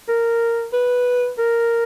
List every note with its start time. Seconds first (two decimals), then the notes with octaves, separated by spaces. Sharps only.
0.09 A#4
0.73 B4
1.39 A#4